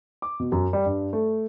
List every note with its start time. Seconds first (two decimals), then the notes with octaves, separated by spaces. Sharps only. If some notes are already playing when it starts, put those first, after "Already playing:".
0.22 D6
0.40 B2
0.52 F#2
0.73 G3
0.86 G2
1.13 A3